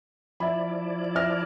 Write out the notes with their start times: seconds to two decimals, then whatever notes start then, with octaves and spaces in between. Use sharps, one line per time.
0.40 F3 E4 D5 E5 B5
1.15 E5 F6 A#6